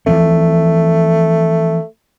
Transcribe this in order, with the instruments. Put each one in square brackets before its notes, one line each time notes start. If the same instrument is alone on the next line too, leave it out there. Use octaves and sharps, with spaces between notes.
[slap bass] E3 F3 C4 [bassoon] A3